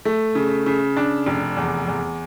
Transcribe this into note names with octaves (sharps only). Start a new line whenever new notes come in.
A3
C#3
C#3
D4
F1
E2
E2